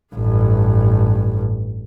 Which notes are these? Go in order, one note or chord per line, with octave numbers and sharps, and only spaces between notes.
A1 G2